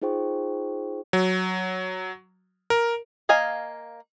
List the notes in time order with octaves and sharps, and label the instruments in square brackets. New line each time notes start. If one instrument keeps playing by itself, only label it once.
[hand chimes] D#4 F4 G#4 C5 G5 C#6
[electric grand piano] F#3
A#4
[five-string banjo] A#3 D#5 F5 G#5